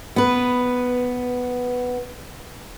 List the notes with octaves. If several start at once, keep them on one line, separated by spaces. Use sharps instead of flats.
B3 B4